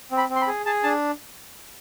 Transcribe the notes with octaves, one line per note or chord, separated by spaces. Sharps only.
C4
B5
C4
C6
B5
G#4
G#4 A5
D4 A5